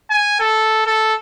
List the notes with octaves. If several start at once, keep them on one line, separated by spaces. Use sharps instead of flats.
G#5
A4
A4